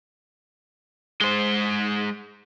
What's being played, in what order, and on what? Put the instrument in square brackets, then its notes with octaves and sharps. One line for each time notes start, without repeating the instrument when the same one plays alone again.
[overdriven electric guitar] G#3 C5